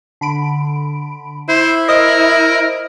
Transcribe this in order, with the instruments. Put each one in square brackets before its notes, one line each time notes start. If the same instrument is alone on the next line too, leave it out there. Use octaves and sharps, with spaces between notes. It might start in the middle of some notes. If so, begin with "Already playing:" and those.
[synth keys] D3 B5 D7
[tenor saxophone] E4 [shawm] C5
[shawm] A#4 [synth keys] C5 D#5 D#6